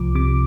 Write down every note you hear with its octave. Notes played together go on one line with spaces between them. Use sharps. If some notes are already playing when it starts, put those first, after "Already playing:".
Already playing: C2 F3 D6
C3 D6